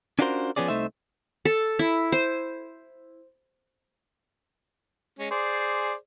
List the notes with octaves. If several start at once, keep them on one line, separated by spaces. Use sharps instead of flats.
C#4 D4 F4 F#4 A#4 C5
F3 F#3 B3 C#4 G#4 D5
C2 F#2 A3 D#4 C5 E5
A4
E4
C5
G#3 C#4
G#4 C5 D5